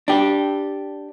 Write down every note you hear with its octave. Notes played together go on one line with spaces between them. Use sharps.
D4 G4